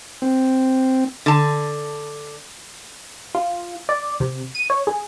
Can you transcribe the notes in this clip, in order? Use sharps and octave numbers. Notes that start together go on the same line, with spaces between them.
C4
D3 A5
F4
D5
C3
D#7
C#5
G#4